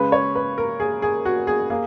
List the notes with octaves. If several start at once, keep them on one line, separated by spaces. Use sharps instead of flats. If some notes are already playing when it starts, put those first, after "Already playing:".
Already playing: C#3 G#3 B4
C#5
B4
A#4
G#4
G#4
F#4
G#4
A#3 G#4